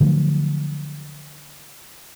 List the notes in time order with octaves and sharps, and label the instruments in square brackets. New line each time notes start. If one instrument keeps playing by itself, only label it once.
[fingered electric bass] D3 F3 F#3 A3